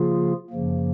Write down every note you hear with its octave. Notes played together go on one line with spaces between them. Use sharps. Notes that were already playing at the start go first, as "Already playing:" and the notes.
Already playing: C#3 F3 A#3 F4 G#4
F#2 C#3 F3 A#3